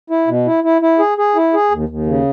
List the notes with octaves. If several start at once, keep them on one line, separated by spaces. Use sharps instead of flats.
E4
B2
E4
E4
E4
G#4
G#4
E4
G#4
D#2
D#2
C#3